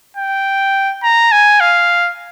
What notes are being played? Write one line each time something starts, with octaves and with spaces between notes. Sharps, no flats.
G5
A#5
G#5
F5